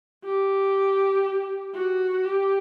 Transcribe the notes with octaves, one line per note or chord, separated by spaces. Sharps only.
G4
F#4
G4